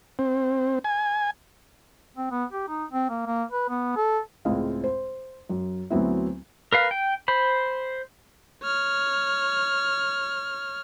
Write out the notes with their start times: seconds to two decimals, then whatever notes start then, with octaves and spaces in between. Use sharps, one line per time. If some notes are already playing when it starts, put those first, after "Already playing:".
0.19 C4
0.84 G#5
2.17 C4
2.31 B3
2.53 G4
2.69 D#4
2.91 C4
3.10 A#3
3.26 A#3
3.51 B4
3.69 B3
3.96 A4
4.45 C#2 A2 G#3 C4 D#5 F5
4.84 C5
5.49 F#2
5.90 D2 F#3 B3 C4 E4
6.72 A#4 B4 F5
6.91 G5
7.28 C5 B5
8.63 C#5 F6